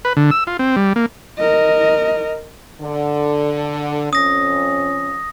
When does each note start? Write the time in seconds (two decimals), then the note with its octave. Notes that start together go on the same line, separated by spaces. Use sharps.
0.05 B4
0.17 D3
0.31 E6
0.47 F4
0.59 C4
0.76 G3
0.96 A#3
1.39 A#4 D#5
2.82 D3
4.13 F2 C#4 D#6 A#6